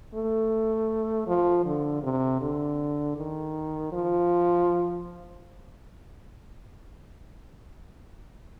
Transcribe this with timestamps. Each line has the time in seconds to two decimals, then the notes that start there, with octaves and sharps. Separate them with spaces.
0.15 A3
1.27 F3
1.65 D3
2.03 C3
2.41 D3
3.17 D#3
3.92 F3